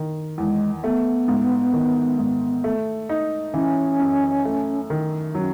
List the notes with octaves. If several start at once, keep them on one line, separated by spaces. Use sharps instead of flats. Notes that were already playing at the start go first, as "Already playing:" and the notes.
Already playing: D#3
E2 G#3
A3 B3
G#2
D#3
G#2
A3
D#4
E3 C#4
F#2
A3
D#3
F#3 C#4